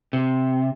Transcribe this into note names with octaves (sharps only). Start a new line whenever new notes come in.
C3